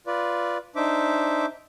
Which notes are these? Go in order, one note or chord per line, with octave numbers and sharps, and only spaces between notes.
F4 B4 D5
D4 D#4 C5 E5 D6